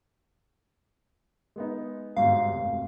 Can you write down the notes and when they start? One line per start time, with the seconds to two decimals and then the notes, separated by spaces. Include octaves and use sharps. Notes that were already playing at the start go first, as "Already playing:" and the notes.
1.56 G#3 B3 D#4
2.16 G1 G#2 B2 F5
2.48 F1